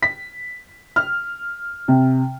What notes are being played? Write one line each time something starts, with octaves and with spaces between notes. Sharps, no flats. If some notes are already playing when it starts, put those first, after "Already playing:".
B6
F6
C3